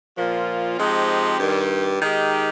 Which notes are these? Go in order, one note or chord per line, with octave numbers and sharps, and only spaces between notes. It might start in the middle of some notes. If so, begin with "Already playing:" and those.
A#2 F3 A#3 F4
F3 G#3 C4 D#4 G4
G2 D#3 G3
D#3 G#3 D#4 G4